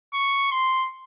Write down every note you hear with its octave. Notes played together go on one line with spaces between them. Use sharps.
C#6
C6